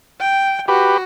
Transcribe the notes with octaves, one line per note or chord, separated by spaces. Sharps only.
G5
F#4 G4 B4